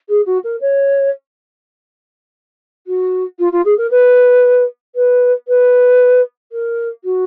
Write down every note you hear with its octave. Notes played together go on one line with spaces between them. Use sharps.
G#4
F#4
A#4
C#5
F#4
F4
F4
G#4
A#4
B4
B4
B4
A#4
F#4